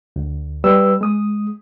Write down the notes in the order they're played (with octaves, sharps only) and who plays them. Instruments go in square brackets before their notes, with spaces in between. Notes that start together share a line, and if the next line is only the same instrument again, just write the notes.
[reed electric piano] D2
G3 B4 E6
G#3 D#6